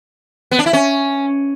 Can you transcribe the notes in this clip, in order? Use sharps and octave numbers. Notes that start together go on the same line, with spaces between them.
B3
D4
E4
C#4